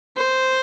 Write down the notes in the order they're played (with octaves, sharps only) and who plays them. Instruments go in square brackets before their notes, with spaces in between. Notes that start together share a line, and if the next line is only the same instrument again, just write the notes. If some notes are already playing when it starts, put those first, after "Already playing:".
[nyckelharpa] C5